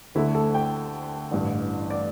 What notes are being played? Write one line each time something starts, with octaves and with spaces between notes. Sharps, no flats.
D2 D3 A3 E4
A4
G5
A1 G2 D3
D5